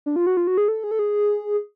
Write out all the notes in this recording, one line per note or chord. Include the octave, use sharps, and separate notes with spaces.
D4
F4
F#4
F4
F#4
G#4
A4
G#4
A4
G#4